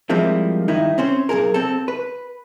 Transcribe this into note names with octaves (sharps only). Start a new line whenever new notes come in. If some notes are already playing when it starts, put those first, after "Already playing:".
F3 G3 G#3 A#3 C4 E4
G2 D#3 D#4 E4
C4 C#4 C5
B1 E2 G#4 A#4
C4 A4
B4